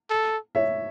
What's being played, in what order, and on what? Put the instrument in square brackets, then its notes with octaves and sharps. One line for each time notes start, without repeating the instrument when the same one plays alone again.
[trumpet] A4
[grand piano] C#5 E5